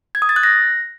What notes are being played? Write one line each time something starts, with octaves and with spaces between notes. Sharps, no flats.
G#6
D#6
A6
F#6
A#6